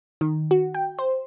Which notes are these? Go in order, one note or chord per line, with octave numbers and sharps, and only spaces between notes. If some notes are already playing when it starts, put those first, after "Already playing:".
D#3
F#4
G5
C5